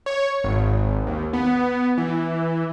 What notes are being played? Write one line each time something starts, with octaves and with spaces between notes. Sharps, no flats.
C#5
G#1
D#2
B3
E3